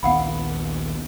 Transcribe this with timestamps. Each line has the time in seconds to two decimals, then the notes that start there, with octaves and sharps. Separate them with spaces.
0.03 A#1 D#2 B3 F5 F#5 B5